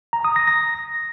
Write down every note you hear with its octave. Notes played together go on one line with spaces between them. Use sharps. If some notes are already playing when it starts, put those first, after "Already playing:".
A#5
D#6
A#6
A#6